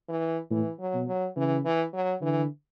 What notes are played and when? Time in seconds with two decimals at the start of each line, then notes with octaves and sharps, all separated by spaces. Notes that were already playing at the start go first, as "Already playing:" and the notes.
0.09 E3
0.50 A2 E3
0.80 F#3
0.94 B2
1.07 F#3
1.36 C#3 E3
1.65 E3
1.93 F#3
2.21 D3 E3